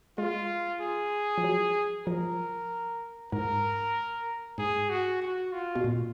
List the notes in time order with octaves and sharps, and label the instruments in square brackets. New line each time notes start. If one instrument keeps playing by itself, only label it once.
[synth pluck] G#3 [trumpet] F4
[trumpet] G#4
[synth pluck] F3
F#3
[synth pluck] F3 [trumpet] A#4
[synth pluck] G#2 [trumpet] A#4
[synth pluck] G#2 [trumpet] G#4
[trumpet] F#4
F#4
F4
[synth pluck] B2
A#2